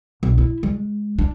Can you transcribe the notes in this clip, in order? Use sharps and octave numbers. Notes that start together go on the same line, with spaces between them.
B1
E4
G#3
D4